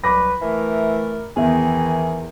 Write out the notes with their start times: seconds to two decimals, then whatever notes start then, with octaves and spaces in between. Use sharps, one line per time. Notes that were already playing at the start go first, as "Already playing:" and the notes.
0.04 C2 F#3 B4 B5 D6 A#6
0.42 E3 A3 A#4
1.36 E2 D#3 E3 G#4 E5